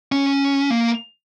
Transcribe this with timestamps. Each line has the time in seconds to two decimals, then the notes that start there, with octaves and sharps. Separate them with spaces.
0.12 C#4
0.70 A#3